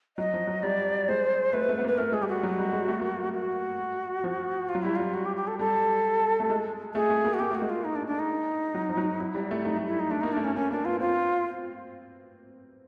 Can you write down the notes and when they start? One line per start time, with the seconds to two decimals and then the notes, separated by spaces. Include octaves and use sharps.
0.17 F#3 D#5
0.34 F3
0.47 F#3
0.63 G3 D5
1.08 G#3 C5
1.53 A3 B4
1.69 A3
1.78 B3
1.84 A#3 B4
1.98 A3 A#4
2.12 G#3 G#4
2.21 G3 G4
2.28 F#4
2.43 F#3
2.58 G3
2.73 G#3
2.88 A3
2.99 A#3
3.23 A3
3.33 F#4
4.24 F3
4.69 F4
4.75 F#3
4.83 G3 E4
4.96 F#3 F4
5.14 F#4
5.26 G4
5.37 G4
5.47 A4
5.59 G3 A4
6.40 A3
6.50 G#3
6.94 A3 G#4
7.10 A3
7.25 A#3
7.34 F#4
7.39 A#3 G4
7.51 A3 F#4
7.62 G#3
7.70 F4
7.84 D#4
7.96 D4
8.07 D4
8.19 D#4
8.75 F#3
8.89 F3
8.97 F#3
9.20 F#3 E4
9.35 G3
9.51 A3
9.65 A3 D#4
9.87 E4
10.00 D#4
10.11 A3 D4
10.21 A#3 D#4
10.33 A3 D4
10.44 C#4
10.55 A#3 C#4
10.71 A#3 D4
10.85 B3 F4
11.00 C4 F4